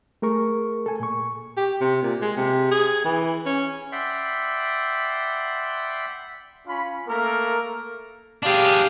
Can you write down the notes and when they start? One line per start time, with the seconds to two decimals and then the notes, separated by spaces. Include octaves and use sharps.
0.22 A3 G#4 A#4 C#6
0.86 A4 G#5
1.00 A#2 C#6
1.57 G4
1.81 C3
2.03 A#2
2.22 G#3
2.37 C3
2.71 G#4
3.05 E3
3.46 C#4
3.92 D5 E5 F#5 G5 B5 C6
6.67 C#4 F4 B5
7.07 A3 A#3 A4 A#4
8.43 D4 G4 G#4 F5